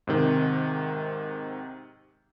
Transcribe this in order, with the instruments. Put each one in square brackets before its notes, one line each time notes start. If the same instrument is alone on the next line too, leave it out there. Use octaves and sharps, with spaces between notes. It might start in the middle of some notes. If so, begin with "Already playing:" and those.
[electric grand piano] G#2 C3 D#3